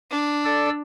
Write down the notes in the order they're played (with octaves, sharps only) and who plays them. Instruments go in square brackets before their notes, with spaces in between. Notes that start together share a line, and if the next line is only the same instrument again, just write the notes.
[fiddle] D4
[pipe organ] A4 D5 E6